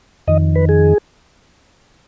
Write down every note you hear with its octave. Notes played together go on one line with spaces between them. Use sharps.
F2 D#3 D#5
B4
G#4